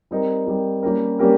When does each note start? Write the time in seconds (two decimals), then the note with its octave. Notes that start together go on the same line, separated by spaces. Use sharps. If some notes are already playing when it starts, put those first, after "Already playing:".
0.11 G3 C4 D#4 A#4
0.47 G3 C4 D#4 A#4
0.83 G3 A#3 C#4 G4 A#4
1.19 G3 A#3 C#4 G4 A#4